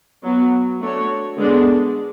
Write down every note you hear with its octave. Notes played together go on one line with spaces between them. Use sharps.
F#3 B3 F#4
A3 D4 F#4 C#5
D3 G#3 B3 D4